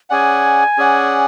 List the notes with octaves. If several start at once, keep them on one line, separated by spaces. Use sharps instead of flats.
C#4 G#4 D5 F#5 G#5
C#4 G#4 D5 F#5